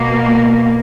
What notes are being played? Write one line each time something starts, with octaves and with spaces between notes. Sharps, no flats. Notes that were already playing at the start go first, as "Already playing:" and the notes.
Already playing: B2 A#3